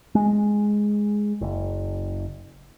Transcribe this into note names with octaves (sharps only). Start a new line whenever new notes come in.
G#3
F#1